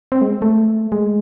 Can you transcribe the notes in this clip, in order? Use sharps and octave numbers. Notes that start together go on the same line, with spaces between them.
C4
G#3
A3
G#3